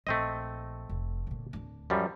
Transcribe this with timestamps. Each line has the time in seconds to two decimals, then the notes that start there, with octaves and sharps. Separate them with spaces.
0.07 A#1 A3 C4 D#5
0.89 F1
1.27 A#2 D3
1.53 D1 D4
1.90 F#2 F3 G3